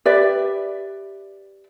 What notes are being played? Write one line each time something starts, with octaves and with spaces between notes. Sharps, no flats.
G4 B4 D5 E5